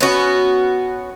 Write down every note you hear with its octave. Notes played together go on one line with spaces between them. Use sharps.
B3 C#4 F#4